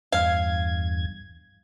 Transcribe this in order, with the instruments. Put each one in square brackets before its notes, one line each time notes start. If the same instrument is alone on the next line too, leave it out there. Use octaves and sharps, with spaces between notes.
[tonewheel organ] E2 G2 G#6 [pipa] F5